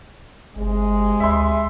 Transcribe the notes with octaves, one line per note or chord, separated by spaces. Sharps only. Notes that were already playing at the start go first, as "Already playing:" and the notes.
G1 C3 G#3
D2 E5 C6